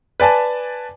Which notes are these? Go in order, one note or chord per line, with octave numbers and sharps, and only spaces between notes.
B4 D5 G#5 A5